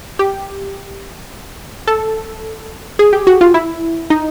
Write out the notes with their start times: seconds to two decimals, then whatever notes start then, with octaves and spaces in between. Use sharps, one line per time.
0.19 G4
1.88 A4
2.99 G#4
3.13 G4
3.27 F#4
3.41 F4
3.54 E4
4.10 D#4